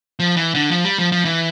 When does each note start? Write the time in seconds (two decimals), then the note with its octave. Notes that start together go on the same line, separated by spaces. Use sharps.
0.19 F3
0.37 E3
0.55 D3
0.71 F3
0.85 G3
0.98 F3
1.12 F3
1.25 E3